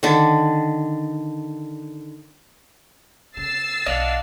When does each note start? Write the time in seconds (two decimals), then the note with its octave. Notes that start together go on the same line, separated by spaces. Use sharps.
0.03 D3 D#3
3.37 C#3 E6 A6 C7
3.86 B1 D4 D#5 F5 F#5